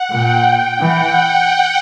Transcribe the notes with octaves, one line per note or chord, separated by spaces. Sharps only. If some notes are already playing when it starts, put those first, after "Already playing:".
Already playing: F#5
A#2 G5
E3 F#5